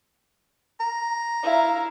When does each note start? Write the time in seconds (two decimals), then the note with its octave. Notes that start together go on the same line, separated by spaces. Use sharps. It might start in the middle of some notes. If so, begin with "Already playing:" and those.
0.80 A#5
1.43 E4 F5